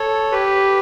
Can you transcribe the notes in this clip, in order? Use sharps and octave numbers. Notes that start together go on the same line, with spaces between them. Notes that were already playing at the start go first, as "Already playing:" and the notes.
Already playing: A4 C#5
G4 B4